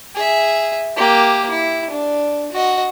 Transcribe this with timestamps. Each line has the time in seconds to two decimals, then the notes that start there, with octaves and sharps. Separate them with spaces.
0.15 G#4 E5
0.96 A#3 G4
1.50 E4
1.90 D4
2.52 F#4 D#5